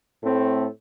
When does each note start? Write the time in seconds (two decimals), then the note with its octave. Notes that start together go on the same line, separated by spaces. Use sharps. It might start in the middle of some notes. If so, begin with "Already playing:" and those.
0.23 A2 A3 C4